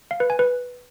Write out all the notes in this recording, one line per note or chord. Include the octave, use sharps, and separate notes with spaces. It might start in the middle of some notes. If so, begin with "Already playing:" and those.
F5
B4
G#5
B4